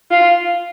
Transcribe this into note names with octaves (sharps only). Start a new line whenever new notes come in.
F4